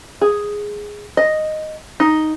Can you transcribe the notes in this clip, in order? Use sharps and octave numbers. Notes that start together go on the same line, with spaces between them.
G#4
D#5
D#4